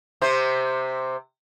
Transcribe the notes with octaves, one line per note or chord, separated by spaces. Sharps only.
C3 C4 C5